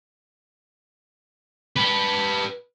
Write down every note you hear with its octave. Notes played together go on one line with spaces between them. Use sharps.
G4 B4